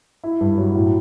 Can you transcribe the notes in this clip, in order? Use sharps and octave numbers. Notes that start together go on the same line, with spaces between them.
E4
G2
F#3
A2